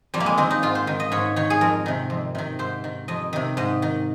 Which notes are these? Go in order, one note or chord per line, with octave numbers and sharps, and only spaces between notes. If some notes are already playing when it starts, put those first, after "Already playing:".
F2 G3
A#3
G#3
D#3 C4
D#4
G#2 F4
C5
D#3
D#5
G#2 C#5
D#3 C#5
G#4
F2 A#4
C3 D#3
F2
C3 D#3
G#2 C5
D#3
F2 D#5
C3 D#3
G#2 D#5
D#3